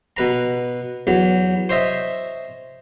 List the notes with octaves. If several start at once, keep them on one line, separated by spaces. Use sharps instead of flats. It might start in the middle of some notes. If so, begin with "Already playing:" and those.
B2 B4 A#5
E2 F#3
C5 C#5 D#5 E5